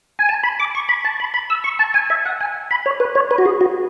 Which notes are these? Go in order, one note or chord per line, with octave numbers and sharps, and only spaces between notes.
G#5
A5
B5
D6
C#6
B5
A5
B5
B5
E6
C#6
A5
G#5
E5
F#5
G#5
B5
C#5
B4
C#5
B4
F#4
G#4
F#4